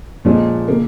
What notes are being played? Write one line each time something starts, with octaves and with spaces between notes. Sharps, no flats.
A#2 F3 G#3 C#4
C#3 A#3